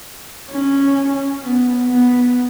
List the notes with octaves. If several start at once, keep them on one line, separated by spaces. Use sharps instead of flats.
C#4
B3
B3